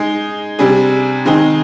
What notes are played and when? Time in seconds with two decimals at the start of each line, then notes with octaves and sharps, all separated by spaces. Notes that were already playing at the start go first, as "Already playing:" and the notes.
Already playing: G#3 D#4 G#4
0.59 C3 G3 D4 G#4
1.25 D#3 G#3 C4 D#4 G#4